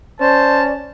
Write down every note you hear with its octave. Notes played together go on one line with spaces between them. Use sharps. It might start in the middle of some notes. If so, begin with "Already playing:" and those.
C#4 C5 D5 A5